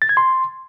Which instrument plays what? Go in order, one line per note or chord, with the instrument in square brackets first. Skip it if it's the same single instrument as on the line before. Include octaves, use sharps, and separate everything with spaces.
[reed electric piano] A6
G#6
C6